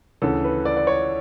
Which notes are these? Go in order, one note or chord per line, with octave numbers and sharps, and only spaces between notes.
D2 C#3 E3 A4
B4
D5
D5
C#5